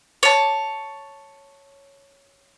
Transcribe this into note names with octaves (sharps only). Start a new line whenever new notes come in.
C#5 A5